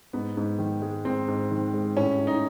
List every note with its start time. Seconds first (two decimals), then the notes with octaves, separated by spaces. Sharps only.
0.13 G#2 B3
0.37 G#2
0.59 D#3
0.82 G#3
1.05 G#2 C4
1.28 G#2
1.51 D#3
1.74 G#3
1.97 A2 C#4
2.19 A2
2.27 D#4